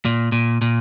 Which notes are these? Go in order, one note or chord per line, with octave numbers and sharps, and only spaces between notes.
A#2
A#2
A#2